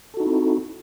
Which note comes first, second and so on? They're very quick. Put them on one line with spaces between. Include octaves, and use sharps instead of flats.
A4 F#4 D#4 E4 C4